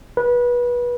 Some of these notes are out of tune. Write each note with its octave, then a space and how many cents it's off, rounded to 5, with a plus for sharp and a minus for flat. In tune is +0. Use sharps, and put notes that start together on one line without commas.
B4 -25